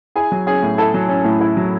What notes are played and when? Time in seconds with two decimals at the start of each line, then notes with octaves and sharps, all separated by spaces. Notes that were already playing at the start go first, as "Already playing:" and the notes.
0.16 E4 G#4 G#5
0.32 F#3
0.47 C#4 G#4 G#5
0.63 A2
0.78 E4 A4 A5
0.94 F#3
1.09 C#4
1.25 A2
1.41 E4
1.57 F#3